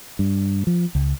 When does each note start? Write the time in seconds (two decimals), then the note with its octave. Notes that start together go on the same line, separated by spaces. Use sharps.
0.19 G2
0.67 F3
0.95 C#2